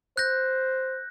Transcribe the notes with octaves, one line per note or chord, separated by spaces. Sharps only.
C5 F#6 G6 A#6